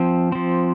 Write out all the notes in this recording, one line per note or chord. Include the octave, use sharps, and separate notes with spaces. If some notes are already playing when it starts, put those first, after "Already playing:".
Already playing: F3 C4
F3 C4